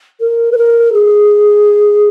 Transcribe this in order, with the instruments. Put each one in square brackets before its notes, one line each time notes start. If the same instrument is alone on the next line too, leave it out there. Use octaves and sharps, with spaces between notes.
[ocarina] A#4
B4
A#4
G#4